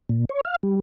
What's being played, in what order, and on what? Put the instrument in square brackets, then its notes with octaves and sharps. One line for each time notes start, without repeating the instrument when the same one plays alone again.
[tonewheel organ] A#2
C#5
F5
G3